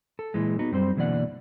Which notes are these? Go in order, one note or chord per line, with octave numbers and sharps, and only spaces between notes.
A4
A#2 E3 G#3
B3 D#4 F#4
F#2 G3 C4 C5
B2 D3 E3 A#3 D5 F#5